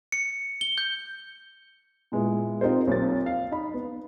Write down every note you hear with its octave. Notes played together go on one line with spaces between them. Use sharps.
C#7
G7
G6
A#2 G#3 B3 E4
C4 D#4 F4 G4 A#4 C5
B1 A#3 C4 A6
F5
D#4 B5
B3